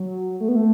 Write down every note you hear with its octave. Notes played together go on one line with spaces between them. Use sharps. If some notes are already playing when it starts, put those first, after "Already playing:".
Already playing: F#3
A3
B3
A3